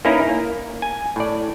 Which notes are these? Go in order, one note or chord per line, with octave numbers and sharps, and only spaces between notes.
A#3 C#4 D#4 E4 A#4 B4
A#3
G#5
A2 D5